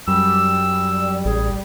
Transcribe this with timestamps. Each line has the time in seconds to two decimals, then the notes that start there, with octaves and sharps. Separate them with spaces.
0.08 F#2 G3 E6
1.25 A1 G#4